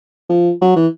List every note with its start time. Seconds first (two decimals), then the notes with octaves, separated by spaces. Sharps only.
0.30 F3
0.61 F#3
0.76 E3